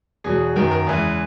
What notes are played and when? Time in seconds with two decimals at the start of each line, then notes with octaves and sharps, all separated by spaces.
0.24 E2 B2 F#3 G#4
0.56 F#2 D#3 F#3 A#4
0.71 A#4
0.86 E2 C#3 E3 G#3 G#4